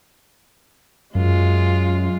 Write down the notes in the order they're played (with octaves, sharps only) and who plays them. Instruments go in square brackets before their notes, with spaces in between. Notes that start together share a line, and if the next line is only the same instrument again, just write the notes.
[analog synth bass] F#2 [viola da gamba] G#3 F4